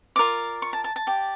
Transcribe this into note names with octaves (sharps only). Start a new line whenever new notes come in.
F4 A#4 D5 D6
C#6
A5
A5
A5
G4 D5